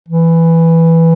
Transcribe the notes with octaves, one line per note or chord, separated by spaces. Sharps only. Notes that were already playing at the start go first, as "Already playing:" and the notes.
E3